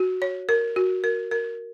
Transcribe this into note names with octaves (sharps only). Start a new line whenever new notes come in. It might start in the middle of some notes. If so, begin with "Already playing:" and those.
Already playing: F#4
C#5
A#4
F#4
A#4
A#4